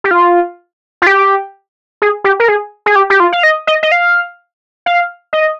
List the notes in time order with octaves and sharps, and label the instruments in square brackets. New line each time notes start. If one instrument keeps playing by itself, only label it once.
[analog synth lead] G4
F4
F4
G4
G#4
G4
A#4
G#4
G#4
G4
G4
F4
F5
D#5
D#5
D#5
F5
F5
D#5